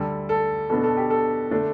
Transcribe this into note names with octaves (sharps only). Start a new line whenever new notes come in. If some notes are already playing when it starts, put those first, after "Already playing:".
Already playing: D2 D3 G3 A4
A4
B2 B3 D4 A4
A4
G4
A4
D3 A3 D4